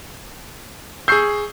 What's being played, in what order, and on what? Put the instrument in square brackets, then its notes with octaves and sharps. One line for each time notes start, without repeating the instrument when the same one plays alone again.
[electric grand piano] G#4 C#6 E6 [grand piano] G6 C7